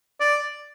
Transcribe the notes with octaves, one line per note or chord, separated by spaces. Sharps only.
D5